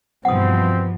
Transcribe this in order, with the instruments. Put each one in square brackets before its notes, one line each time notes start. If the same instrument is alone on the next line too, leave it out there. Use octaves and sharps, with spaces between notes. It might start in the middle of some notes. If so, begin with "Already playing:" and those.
[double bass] G2 [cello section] B2 E3 F3 [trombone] C4 [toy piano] F#5 D#6